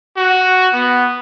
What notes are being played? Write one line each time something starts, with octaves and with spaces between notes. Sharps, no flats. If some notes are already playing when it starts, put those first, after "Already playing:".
F#4
B3